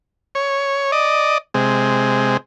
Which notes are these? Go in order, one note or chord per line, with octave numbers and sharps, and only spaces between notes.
C#5
D5 D#5
C3 G#3